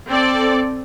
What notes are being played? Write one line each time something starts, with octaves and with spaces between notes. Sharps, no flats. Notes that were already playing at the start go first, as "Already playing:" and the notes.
C4 A4 D5